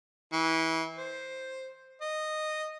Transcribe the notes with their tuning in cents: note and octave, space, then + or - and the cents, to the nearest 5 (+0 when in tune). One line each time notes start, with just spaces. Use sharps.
E3 -25
C5 +5
D#5 -10